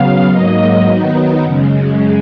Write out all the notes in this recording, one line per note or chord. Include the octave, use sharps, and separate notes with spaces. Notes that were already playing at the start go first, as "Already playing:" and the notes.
Already playing: C#3 F#3 B3 F5
G#2 F#3 A#3 D#5
D#3 F#3 B3 D#4
F#2 C#3 G#3